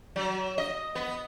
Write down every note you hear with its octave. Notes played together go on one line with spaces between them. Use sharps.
F#3
D#5
B3